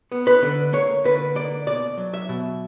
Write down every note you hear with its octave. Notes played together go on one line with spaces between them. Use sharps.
B3
B4
D3
A#3 C#5
D3 B4
A#3 D5
B2 D5
F#3
E5
B2